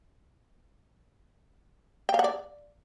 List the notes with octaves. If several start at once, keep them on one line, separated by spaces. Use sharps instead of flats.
G5
F5
F#5
D5